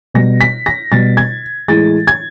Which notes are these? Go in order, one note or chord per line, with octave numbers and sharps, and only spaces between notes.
B2 G3 A#6
B6
A#6
B2 G3 A6
G#6
A2 E3 G#3 A6
G#6